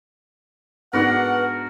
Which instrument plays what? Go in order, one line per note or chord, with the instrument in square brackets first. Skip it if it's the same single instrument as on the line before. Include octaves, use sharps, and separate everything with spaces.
[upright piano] G#2 B3 [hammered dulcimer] D4 F#4 A#4 [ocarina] B4 [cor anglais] F#5